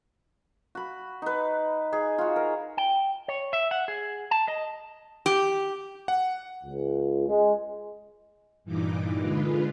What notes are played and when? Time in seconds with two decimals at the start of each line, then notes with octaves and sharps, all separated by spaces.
0.75 F#4 B5
1.22 D#4 B4
1.92 D#4 G#4
2.18 F4 F#4
2.36 A#4
2.77 G5
3.28 C#5
3.53 E5
3.71 F#5
3.88 G#4
4.31 A5
4.48 D#5
5.26 G4
6.08 F#5
6.64 C#2
7.28 G#3
8.64 G2 A#2 E3 D#4 D6
9.20 D3 G#3 F4 B4